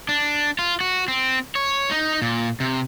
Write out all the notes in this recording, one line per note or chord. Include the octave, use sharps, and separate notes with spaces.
D4
F4
F#4
C4
C#5
D#4
A#2
C3